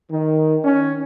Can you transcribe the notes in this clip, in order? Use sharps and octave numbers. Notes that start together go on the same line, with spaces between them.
D#3
C#4